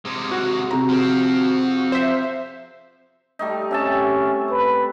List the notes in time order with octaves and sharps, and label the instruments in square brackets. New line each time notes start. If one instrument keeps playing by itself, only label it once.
[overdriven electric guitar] C3 G#3
[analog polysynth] F#4
[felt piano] C3 G#4 A#5
[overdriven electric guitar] F3 C4
[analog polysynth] C5 E5
[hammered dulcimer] G3 A3 D#4
[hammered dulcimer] C3 E5 A5 [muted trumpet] C#4
[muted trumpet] B4